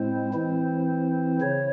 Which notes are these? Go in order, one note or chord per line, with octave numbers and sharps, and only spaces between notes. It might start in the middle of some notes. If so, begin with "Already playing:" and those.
Already playing: A2 G#3 C4 E4 C5
E3 C4 E4
C#3 C#5